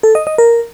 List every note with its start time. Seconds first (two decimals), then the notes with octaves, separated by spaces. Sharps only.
0.03 A4
0.15 D#5
0.27 D#5
0.38 A#4